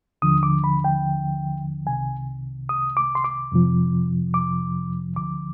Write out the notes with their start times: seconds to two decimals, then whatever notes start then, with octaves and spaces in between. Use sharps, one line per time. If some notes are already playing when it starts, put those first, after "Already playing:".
0.22 D#2 D3 F3 D#6
0.43 D6
0.64 B5
0.84 G5
1.87 C2 C3 D#3 G#5
2.69 D#6
2.97 D6
3.15 C6
3.24 D6
3.52 F2 C3 F3
4.34 D6
5.16 D2 D3 F3 D6